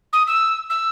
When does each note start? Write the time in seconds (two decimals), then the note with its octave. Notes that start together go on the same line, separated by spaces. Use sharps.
0.13 D#6
0.27 E6
0.69 E6